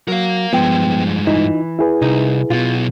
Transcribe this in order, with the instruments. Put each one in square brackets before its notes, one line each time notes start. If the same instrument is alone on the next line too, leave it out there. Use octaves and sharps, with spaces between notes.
[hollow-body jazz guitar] F#3 [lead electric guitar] A#4 F5
[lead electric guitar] G2 G#3 [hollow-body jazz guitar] F3 [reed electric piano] B3 G5
[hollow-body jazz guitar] E3 [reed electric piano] D#4 F4
[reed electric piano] E4 G#4 B4
[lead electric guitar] C2 [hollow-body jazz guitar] D#4
[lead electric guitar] B1 B2 [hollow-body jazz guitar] F4